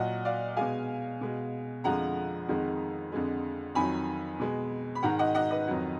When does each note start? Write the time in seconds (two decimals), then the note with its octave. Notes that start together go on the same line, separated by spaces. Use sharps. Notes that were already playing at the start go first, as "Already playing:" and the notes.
Already playing: A#2 F#3 D#5 F#5
0.25 D5 F5
0.56 B2 G#3 F5 G#5
1.21 B2 G#3
1.84 F2 D3 F3 G#3 F#5 A#5
2.49 F2 D#3 G#3
3.12 F2 D3 G#3
3.75 F2 D#3 F#3 G#5 B5
4.40 B2 G#3
4.95 B5
5.03 G#2 D#3 G#3 F#5 A#5
5.19 D#5 F#5
5.35 D#5 F#5
5.51 B4 D#5
5.67 F2 D#3 F#3